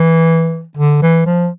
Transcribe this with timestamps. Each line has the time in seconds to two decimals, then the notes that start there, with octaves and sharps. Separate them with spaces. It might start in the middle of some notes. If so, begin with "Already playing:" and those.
Already playing: E3
0.77 D3
1.02 E3
1.26 F3